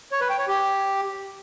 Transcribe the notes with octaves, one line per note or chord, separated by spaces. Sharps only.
C#5
B4
G5
C#5
G4